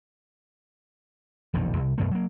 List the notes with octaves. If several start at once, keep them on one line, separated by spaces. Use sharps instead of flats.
E1 A#1 F2 D#3
C2
F#2 B2 A3
F#3 A#3